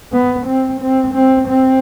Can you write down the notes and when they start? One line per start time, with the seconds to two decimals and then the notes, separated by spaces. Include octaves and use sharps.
0.12 B3
0.46 C4
0.81 C4
1.14 C4
1.48 C4